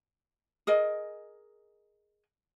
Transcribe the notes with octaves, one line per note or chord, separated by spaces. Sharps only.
G#4 A#4 D#5